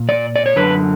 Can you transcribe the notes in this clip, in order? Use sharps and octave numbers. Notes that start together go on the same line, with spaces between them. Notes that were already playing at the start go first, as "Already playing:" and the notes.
Already playing: A#2
D5
D5
C#5
F#2 D3 B4